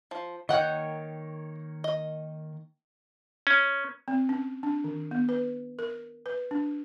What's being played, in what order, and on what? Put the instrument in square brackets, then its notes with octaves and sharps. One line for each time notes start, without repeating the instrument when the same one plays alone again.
[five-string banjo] F3
[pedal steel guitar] D#3 A#3 C#5 [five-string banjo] D#5 F#5 G5
[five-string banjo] D#5
[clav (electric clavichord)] C#4
[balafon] C4
C#4
D4
D#3
B3
B4
A#4
B4
D4